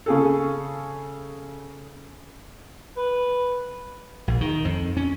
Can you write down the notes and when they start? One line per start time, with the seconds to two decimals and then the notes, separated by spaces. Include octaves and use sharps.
0.06 C#3 G#4 A4
2.97 B4
4.28 A#1
4.41 D#3
4.65 F2
4.97 C#4